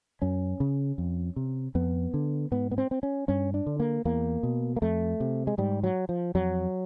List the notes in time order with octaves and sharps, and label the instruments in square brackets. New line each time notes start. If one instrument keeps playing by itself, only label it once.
[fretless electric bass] F#2 C#4
C#3
F2
C3
F2 B3
D3
G#2 B3
B3
C4
C4
C#4
G2 C#4
D4
D3
A#3
E2 A#3
B2
A#3
F2 A3
C3
G#3
G#2 G3
F#3
F3
F2 F#3